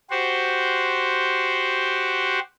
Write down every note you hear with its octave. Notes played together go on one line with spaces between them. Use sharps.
F#4 G4 C5